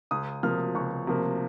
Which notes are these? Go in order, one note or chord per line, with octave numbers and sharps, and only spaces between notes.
C#2 D#6
C3 F3 A#3 F6
C#2 C#6
C3 F3 A#3